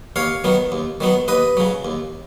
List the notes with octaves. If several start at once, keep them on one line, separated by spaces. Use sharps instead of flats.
D#2 C#5 F5
D#3 F#3 B3
D#2
D#3 F#3 B3
D#2 B4 D#5
C#3 F#3
D#2